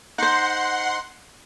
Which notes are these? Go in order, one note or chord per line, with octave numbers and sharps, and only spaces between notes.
D#4 C5 F#5 C6